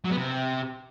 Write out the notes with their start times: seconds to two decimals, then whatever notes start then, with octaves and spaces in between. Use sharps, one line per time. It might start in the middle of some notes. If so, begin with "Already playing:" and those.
0.05 F#3
0.11 B3
0.17 C3